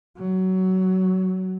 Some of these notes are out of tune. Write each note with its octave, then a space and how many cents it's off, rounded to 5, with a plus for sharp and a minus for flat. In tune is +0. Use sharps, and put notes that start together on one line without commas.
F#3 +15